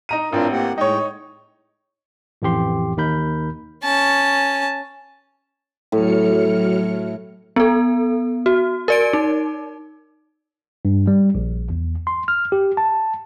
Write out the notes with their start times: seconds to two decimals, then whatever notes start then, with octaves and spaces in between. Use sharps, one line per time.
0.09 D#4 A#5 D#7
0.33 A1 C4 D4 F4 A#4
0.51 A#3 G4 F#5
0.78 A2 G#3 D#4 C#5 G5
2.42 A1 F2 E3 G4 C6
2.97 D#2 D#4 A#4 B5 G6
3.83 C#4 A5
5.92 A2 F#3 F6 C#7
7.56 B3 A4
8.46 F#4
8.88 A#4 D5 D7
9.13 D#4
10.85 G2
11.07 G3
11.35 A#1
11.70 E2
12.07 C6
12.28 F6
12.52 G4
12.77 A5